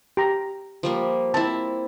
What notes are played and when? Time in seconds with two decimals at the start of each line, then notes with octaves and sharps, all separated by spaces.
0.17 G4 A#5
0.83 F3 G3 A#3
1.34 C4 E4 A5